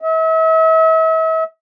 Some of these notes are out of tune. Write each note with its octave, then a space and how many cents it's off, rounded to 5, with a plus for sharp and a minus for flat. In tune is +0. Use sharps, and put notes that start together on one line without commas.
E5 -40